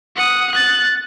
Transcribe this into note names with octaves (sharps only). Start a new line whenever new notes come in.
F#5 D#6
F#6 A6